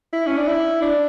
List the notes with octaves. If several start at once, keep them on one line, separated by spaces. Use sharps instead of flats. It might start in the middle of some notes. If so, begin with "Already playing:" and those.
E4
C#4
D4
E4
D4